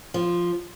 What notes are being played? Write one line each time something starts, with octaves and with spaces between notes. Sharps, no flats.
F3